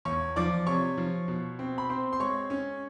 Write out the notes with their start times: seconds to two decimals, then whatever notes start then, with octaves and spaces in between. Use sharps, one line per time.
0.05 E2 C#5 C#6
0.36 F3 D5 D6
0.66 C3 C#5 C#6
0.98 F3
1.28 B2
1.59 C4
1.78 B5
1.89 C4 C5 C6
2.13 C6
2.20 G#3 C#5 C#6
2.50 C#4